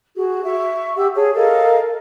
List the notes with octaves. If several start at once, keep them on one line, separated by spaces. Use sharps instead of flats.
F#4 G#4
E5 C#6
G4 F#5 E6
G#4 C#5 A5
A4 A#4 D#5 F5